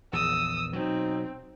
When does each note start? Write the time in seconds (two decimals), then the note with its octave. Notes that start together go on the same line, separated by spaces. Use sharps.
0.13 A#1 E2 D#6 E6
0.73 B2 F#3 C4 D#4